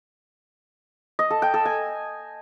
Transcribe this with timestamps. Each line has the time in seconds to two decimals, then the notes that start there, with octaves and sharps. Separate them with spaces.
1.19 D#5
1.31 A4
1.42 G5
1.54 A4
1.65 G#5